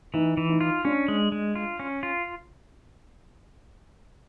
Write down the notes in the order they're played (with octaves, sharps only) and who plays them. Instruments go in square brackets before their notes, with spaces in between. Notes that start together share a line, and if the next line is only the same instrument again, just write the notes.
[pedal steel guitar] E3 [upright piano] D#4
[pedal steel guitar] E3
[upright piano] D#4
[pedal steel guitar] F4
[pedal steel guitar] C#4 [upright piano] D4
[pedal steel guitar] G#3
G#3
F4
C#4
F4